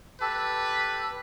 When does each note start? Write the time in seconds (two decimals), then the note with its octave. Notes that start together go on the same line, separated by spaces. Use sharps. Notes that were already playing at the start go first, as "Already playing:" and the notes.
0.21 G4 A4 B4 A5